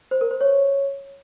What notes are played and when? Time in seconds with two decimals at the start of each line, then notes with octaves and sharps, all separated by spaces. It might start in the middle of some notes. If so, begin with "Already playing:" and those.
0.11 C5
0.21 A#4
0.31 C5
0.41 C#5